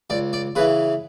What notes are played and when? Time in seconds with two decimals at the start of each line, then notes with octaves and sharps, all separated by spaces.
0.10 C#2 D5
0.33 D5
0.56 C#3 B4
0.59 E3